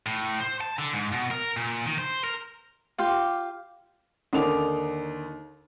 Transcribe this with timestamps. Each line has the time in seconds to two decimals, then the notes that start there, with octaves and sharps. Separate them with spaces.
0.06 A2
0.41 C5
0.61 A5
0.79 D3
0.94 G#2
1.12 B2
1.31 A#4
1.57 A#2
1.86 D#3
1.98 C5
2.24 A#4
2.98 F4 G4 F5
4.33 D#2 D3 D#3 D#4 D6 F7